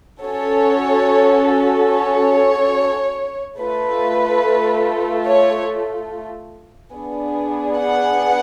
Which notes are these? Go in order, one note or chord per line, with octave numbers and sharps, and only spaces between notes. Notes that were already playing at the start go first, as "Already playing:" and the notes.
C#4 F#4 A4 C#5
C#5
A3 F4 A4 B4
C#5
B3 D4 G#4
F#5